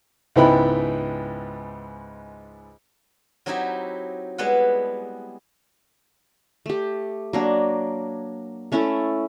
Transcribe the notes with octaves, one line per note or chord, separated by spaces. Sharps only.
C#2 G#2 B3 E4 G5 B5
F#3 C4 D#4 E4 G4 E5
G3 G#3 B3 E4 B4 F#5
A3 G4
F#3 A#3 D4
A3 C#4 E4 A4